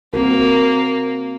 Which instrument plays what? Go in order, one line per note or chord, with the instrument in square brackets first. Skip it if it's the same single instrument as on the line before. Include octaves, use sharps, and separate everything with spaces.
[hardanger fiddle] A#3 [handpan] C4 F#4 A#4